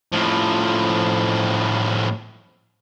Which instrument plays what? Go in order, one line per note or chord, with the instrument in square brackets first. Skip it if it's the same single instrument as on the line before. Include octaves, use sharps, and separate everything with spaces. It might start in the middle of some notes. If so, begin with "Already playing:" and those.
[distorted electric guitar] A2 F3